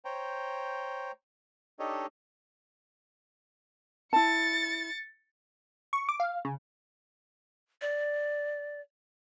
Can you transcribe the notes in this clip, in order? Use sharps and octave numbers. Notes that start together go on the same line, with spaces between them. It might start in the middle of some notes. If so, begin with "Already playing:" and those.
C5 C#5 G5 A#5
D4 D#4 G4 A4 C#5 D#5
E4 A5 A6 C#7
C#6
D6
F5
C#3
D5